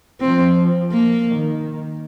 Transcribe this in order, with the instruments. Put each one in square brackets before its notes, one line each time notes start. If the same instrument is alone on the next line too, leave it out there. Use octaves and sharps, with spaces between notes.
[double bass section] F3 [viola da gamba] C4
[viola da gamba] A#3
[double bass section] D#3